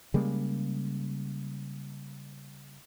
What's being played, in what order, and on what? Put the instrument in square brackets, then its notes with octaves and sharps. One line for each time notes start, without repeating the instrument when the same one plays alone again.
[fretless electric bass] C#3 G3 G#3 A#3